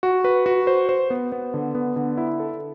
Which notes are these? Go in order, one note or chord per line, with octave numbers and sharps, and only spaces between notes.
F#4
B4
F#4
C5
C5
B3
B3
D3
B3
D3
E4
A4